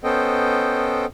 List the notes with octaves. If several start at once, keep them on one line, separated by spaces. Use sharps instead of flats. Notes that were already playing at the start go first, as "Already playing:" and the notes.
B3 C#4 A4 C5 D#5 G5